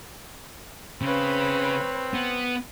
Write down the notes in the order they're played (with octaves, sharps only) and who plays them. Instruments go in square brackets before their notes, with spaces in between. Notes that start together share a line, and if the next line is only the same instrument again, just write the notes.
[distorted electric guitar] C#3 [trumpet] C4 [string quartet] B4 C#5 B5
[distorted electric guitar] B3